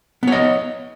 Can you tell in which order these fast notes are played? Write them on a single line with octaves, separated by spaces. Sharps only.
B3 C#5 D#5